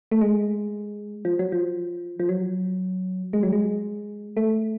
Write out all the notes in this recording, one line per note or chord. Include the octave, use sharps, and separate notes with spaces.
A3
G#3
F3
F#3
F3
F3
F#3
G#3
F#3
G#3
A3